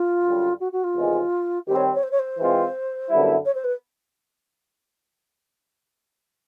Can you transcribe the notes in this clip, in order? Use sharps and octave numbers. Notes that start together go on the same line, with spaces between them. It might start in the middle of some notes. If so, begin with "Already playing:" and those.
Already playing: F4
F#2 D3 G3
F#4
F#4
F4
E2 C3 D#3 G#3
D#3 G3 C4 G4
C#5
C#5
C5
C#5
C5
E3 G#3 C4 F4
F#2 D3 G3 B3 E4
C#5
C5
B4